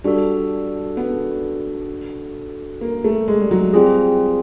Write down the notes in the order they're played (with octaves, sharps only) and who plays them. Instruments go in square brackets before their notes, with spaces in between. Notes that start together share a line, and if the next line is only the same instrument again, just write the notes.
[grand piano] G3 [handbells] D4 F#4 A4
[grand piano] B3
A#3
A3
G#3
G3
F#3
[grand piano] G3 [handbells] C4 F4 G#4